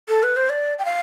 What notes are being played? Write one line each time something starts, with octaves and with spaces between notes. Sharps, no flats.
A4
B4
C5
D5
G5
F5